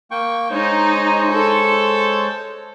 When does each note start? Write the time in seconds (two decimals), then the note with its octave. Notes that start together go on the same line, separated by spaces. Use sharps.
0.11 A#3 G5 C#6
0.51 G#3 D#4 C5 C#5
1.31 A4